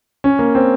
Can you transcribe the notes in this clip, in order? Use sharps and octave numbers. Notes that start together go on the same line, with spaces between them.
C#4
A#3
C4